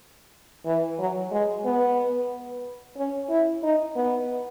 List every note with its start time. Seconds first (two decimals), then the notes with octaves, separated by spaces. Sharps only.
0.66 E3
0.99 F#3
1.31 G#3
1.65 B3
2.97 C#4
3.30 E4
3.63 D#4
3.95 B3